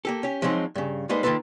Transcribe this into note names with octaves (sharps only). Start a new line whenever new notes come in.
A#3 G4 A4
C#4 G4
F3 F#3 G#3 C4 D#4
G2 C#3
G3 G#3 A#3 D#4 B4 C5
D#3 A#3 D#4 F4 A4 B4